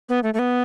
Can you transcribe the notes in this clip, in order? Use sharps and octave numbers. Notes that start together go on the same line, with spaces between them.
B3
A3
A3
B3